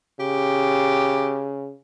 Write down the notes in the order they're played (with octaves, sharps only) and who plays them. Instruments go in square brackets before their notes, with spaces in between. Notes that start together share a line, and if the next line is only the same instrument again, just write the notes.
[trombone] C#3 [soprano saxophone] G4